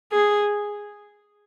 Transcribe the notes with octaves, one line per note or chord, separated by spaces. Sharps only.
G#4